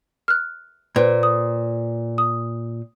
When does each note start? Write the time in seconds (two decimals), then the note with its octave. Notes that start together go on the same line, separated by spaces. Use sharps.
0.28 F6 F#6
0.96 A#2 B4 C5
1.23 D#6
2.18 D#6